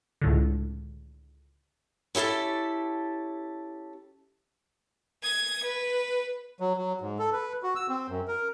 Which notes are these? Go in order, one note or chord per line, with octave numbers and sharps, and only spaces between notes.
C#2 A2 D3
C#4 E4 G4 A4 A5
D#6 G#6
B4
F#3
F#3
G#2
A4
B4
F#4
E6
C4
F#2
A#4